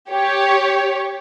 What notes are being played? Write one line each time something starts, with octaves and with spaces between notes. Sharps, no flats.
G4 C#5